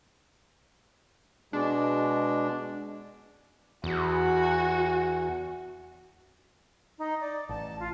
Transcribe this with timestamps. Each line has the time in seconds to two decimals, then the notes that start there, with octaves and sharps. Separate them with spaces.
1.53 B2 G#3 D4
3.84 E2 F#4
6.99 D#4
7.21 D5
7.49 A1 A5
7.80 F4